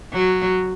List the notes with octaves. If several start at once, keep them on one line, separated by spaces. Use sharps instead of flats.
F#3